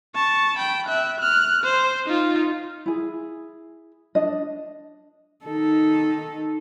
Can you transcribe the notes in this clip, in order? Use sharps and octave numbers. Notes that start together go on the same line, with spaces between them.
A5 C#6
G5 B5
E5 F#6
F6 F#6
C5
D#4 F4
E4 G#4
D4 D#5
D#3 D#4 A4